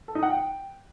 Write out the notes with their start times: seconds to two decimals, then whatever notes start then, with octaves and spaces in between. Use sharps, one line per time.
0.08 A4
0.15 D#4
0.23 F#5
0.30 G5